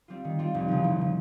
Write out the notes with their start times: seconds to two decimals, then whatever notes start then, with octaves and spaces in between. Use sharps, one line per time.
0.08 G3 C4 F4
0.24 D#3
0.39 G3 C4 F4
0.55 F1
0.68 E2 C#3 F3
0.84 F1
0.98 C#3 F3